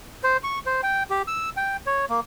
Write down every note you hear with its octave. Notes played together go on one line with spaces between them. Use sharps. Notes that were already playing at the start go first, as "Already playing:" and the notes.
C5
C#6
C5
G5
G4
E6
G5
C#5
A#3